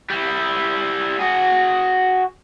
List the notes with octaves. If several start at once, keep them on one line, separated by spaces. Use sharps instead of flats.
G3 E4
F#4 G#4